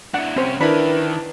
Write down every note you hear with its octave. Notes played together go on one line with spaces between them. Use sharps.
D4 E4 F#5
C2 C4 C#4 C5
D#3 D4 E4 A#4 B4 B5